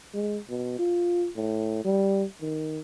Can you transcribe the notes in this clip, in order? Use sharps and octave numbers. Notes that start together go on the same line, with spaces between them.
G#3
B2
F4
A2
G3
D#3